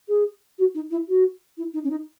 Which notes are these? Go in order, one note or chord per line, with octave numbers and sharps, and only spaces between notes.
G#4
F#4
D#4
E4
F#4
E4
D#4
C#4
D#4